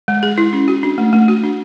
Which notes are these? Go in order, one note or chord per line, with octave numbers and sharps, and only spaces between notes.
G#3
G#4
E4
C#4
F#4
D4
A3
A3
F#4
D4